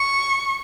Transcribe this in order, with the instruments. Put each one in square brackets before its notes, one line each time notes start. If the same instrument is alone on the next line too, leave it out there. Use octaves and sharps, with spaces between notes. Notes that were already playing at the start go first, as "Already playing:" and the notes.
Already playing: [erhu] C#6